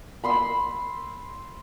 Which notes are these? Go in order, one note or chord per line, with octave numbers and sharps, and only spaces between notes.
B5 C6 E6